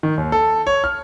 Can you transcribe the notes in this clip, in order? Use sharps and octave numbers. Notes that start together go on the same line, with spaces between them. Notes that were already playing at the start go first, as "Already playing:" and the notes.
D#3
D#2
A4
C#5
F6